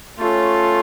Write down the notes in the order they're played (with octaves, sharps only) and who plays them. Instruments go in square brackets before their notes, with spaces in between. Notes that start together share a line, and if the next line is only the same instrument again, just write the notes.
[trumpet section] A3 C#4 A4 C#5 [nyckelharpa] F4